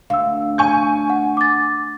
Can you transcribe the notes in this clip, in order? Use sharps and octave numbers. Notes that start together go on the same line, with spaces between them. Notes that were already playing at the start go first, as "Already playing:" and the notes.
D2 F5 E6
G#5 C#6 G6
F#5
D6 A6